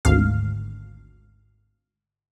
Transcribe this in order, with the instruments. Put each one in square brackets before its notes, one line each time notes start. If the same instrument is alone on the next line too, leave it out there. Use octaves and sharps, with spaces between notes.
[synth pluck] G#1 D2 F5